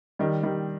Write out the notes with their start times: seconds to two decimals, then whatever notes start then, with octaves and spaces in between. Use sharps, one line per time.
0.19 D#3 G3
0.43 D#3 G3